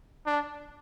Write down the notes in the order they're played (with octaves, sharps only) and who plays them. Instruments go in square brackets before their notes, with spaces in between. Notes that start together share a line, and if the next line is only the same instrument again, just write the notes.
[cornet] D4